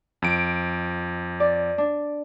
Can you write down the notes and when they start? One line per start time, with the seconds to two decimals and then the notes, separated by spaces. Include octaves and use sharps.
0.22 F2 D7
1.40 D5
1.78 D4